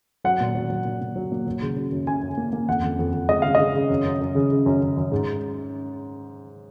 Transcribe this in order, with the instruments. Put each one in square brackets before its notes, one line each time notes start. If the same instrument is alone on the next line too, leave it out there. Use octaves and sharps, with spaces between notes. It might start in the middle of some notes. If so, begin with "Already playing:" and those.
[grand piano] F#3 F#5
A#2
F#3
F#3
A#2
A#2
F#3
A#3
F#3
C#3
F#3
F#2
C#3 G#5
F#2
A#3
A#3
F2 F#5
F2
F2
F2
G#3 D#5
C#3 F5
C#3 D#5
C#3
F#2
F#2
F#2
C#3
C#3
F#2
F#2
F#2
G#2